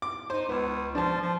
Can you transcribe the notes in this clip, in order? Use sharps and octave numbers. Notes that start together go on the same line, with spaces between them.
D6
D#4 C5
C#2 B3
F3 D4 A5
F3